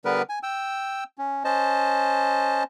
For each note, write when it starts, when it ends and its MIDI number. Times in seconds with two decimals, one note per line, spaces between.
0.05 0.22 50
0.05 0.22 55
0.05 0.22 59
0.05 0.22 70
0.05 0.22 71
0.29 0.39 80
0.43 1.04 79
0.43 1.04 88
1.18 1.44 61
1.45 2.63 61
1.45 2.63 72
1.45 2.63 75
1.45 2.63 81